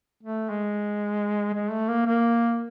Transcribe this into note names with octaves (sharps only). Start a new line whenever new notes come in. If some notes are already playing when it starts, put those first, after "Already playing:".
A3
G#3
G#3
A3
A#3
A#3